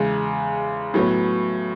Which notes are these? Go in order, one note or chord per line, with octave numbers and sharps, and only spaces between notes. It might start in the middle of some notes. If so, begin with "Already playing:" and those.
Already playing: E2 C#3 G#3
A2 F#3 B3